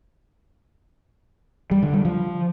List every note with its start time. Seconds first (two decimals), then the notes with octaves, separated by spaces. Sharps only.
1.71 G3
1.83 D3
1.94 G3
2.05 F3